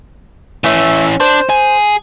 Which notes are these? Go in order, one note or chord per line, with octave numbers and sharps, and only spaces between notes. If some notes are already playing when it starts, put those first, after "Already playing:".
E3 A3 C#4 E5
D4 C5
G#4